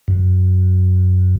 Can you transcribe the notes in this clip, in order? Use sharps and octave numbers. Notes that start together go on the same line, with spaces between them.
F#2